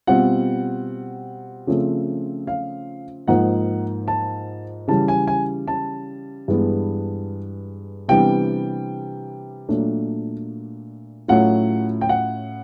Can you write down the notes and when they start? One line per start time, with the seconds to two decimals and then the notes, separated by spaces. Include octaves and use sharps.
0.07 B2 G3 C4 F4 F#5
1.67 C#3 F3 A3 C4
2.47 F5
3.28 G#2 F3 A#3 D#4 F#5
4.08 A5
4.87 C#3 E3 G3 A5
5.08 G#5
5.27 G#5
5.68 A5
6.48 G2 E3 G#3 B3
8.08 C3 E3 G3 B3 D4 G5
9.68 A#2 F#3 A3 D4
11.28 A2 F#3 A3 C#4 F4 F#5
12.01 G5
12.09 F#5